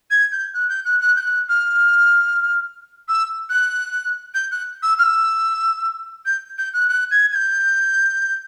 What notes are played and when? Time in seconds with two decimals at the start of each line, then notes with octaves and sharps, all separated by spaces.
0.11 G#6
0.32 G6
0.54 F#6
0.69 G6
0.85 F#6
1.01 F#6
1.17 G6
1.20 F#6
1.49 F6
3.08 E6
3.50 F#6
4.34 G6
4.51 F#6
4.83 E6
4.99 F6
5.03 E6
6.26 G6
6.58 G6
6.74 F#6
6.89 F#6
7.11 G#6
7.32 G#6
7.35 G6